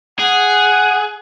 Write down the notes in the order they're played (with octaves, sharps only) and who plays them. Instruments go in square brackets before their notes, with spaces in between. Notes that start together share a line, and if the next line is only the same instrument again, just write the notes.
[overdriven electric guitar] G#4 [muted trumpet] F#5